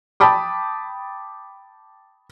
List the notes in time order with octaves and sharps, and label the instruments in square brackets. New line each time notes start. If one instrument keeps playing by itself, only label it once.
[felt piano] G5 A5 B5 D6 D#6